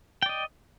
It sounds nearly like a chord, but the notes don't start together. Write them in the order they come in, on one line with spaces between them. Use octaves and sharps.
G5 D5 D#5